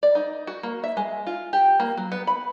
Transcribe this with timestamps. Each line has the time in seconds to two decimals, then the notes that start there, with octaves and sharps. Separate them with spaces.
0.03 D5
0.15 D#4
0.47 F#4
0.63 A#3
0.84 E5
0.97 G#3
1.27 F4
1.53 G4
1.80 A#3
1.97 F#3
2.12 B3
2.27 B5